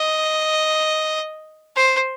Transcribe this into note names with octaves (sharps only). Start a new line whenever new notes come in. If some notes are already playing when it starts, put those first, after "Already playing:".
Already playing: D#5
C5